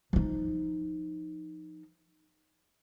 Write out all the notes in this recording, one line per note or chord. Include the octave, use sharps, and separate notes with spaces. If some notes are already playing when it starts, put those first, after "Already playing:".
F3 D#4